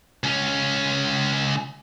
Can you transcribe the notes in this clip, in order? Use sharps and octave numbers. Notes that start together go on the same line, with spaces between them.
C#2 C#4